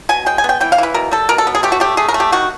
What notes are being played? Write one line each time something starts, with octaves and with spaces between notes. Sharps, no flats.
B2 G#5
G#3 G5
G#5
B3
G5
E3 G5
F5
E3 B4
B2 A#4
G3 A4
B2 A#4
A4
B3
G#4
A3 G4
F#4
A3 G4
A3 G#4
A#4
A3
G4
D#3 F#4